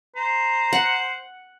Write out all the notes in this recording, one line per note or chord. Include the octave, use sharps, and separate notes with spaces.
C5 A#5
F#5